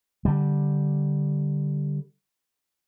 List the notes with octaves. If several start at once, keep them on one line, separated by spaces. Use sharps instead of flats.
D3 G3